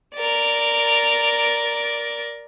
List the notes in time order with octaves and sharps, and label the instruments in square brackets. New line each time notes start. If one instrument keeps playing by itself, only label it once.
[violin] A#4 D5